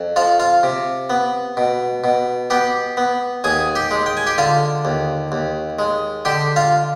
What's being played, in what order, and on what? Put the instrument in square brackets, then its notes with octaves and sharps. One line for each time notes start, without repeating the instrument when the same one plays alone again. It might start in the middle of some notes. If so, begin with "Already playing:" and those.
Already playing: [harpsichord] F2
F3 F4 F5
F4 F5
C3
B3
B2
B2
B3 G4 G5
B3
D#2 G#4 G#5
G4 G5
G#3
G5
G#5
G4 G5
D3 F4 F5
D#2
D#2
G#3
D3 G4 G5
F4 F5